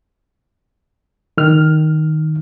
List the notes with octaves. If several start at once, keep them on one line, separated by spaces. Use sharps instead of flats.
D#3 F6